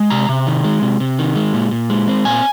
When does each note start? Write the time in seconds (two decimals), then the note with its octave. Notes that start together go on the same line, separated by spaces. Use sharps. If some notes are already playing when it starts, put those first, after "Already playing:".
Already playing: G#3
0.10 C3 A#5
0.29 C3
0.46 D#3
0.64 G#3
0.82 C3
1.00 C3
1.19 D#3
1.36 G#3
1.53 A#2
1.71 A#2
1.90 G#3
2.08 C4
2.25 A#2 G#5